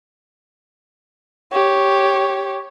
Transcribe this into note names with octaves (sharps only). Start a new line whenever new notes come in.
G4 C#5